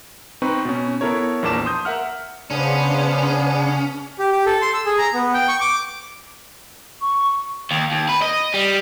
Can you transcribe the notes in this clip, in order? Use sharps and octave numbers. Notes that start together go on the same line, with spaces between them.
C4 D#4 B4 C#6
B2 C#4
B3 E4 A4 A#4 C#5
A#1 E2 A#3 A5 D6 E7
C6 D#6 G6
A#4 E5 F#5 F6
C#3 B3 C#4 D4 G#4 B4 C5 F5
G4
G4
A4
C6
E6
G#4
A#5
B3
G5
C#6
D6
C#6
D#2
D#2
B4
D#5
G3